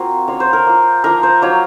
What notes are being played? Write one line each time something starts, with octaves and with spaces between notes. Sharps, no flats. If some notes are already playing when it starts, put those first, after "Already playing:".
Already playing: A#3 C4 F4 F#4
A#3 F4 C#5
C5
A#4
A#3 F4
F3 A#3 F4 A#4
C5
F#3 A#3 F4 C#5